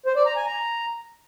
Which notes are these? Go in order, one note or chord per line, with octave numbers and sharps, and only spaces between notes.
C5
D5
A#5
G#5
A#5